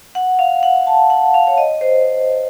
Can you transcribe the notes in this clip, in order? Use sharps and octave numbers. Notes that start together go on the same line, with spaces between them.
F#5
F5
F#5
A5
F#5
F5
C#5
D#5
C5
C5